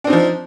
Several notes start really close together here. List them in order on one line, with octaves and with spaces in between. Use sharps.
D4 C4 D#4 F3